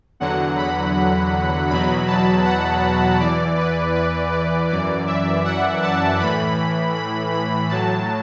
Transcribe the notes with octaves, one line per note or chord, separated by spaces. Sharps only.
E2 D3 F#3 F#5
B5
E2 B2 F#3 B5
A5
F#5
E2 E3 D5
B4
B4
D5
F#2 E3 D5
E5
F#5
A5
A2 E3 B5
B5
B5
A2 F#3 A5